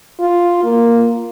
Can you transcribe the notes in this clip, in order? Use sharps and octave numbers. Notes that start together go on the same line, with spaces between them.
F4
A#3